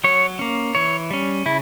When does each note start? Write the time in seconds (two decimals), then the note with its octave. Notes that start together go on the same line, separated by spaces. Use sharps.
0.04 F#3 C#5
0.39 A#3 C#4
0.75 E3 C#5
1.11 G3 C#4
1.46 C#3 E4